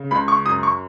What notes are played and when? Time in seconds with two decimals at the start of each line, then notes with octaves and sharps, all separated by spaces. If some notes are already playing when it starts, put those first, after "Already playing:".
Already playing: C#3
0.11 C#2 B5
0.28 C#6
0.46 F#2 D#6
0.63 C#6